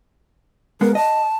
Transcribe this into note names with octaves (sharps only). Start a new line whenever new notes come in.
G#3 B3 A#4
D#5 A5